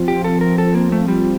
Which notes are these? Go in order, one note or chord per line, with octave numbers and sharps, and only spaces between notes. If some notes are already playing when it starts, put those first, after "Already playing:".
Already playing: F3 C4 F4
G4
A4
A#4
A4
A#3
A3
G3